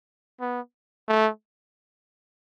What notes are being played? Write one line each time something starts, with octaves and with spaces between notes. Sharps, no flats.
B3
A3